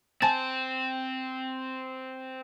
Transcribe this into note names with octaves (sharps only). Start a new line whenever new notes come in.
C4 G#5 A5 A6